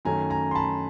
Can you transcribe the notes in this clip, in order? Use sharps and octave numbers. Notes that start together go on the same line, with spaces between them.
F#2 D#3 F#3 A3 C#4 G#5 A#5
G#5 A#5
C6
A5 B5